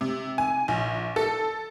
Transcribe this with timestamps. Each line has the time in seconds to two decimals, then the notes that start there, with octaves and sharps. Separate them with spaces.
0.01 C3
0.38 G#5
0.68 A#1
1.16 A4